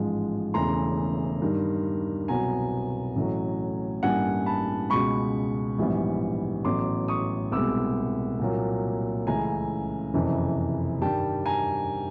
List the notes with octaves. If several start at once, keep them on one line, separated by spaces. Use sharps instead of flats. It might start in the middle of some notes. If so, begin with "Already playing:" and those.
Already playing: A1 G#2 F3 G#3
E1 E2 C#3 E3 A3 A#5 C6
G2 D#3 G3
C2 B2 F#3 B3 G#5 A#5
A1 A2 F#3
A1 G2 E3 G3 A#3 F#5 G#5
A5 B5
C#2 B2 G#3 B5 C#6
A#1 G#2 E3 G3 B3
A1 A2 F#3 B3 C6 D6
C#6 D#6
C2 B2 G#3 B3 D6 E6
C2 A#2 F#3 A#3
C#2 C#3 E3 A3 G#5 A#5
F#1 F2 C3 E3
G2 D#3 G3 G5 A5
G#5 A#5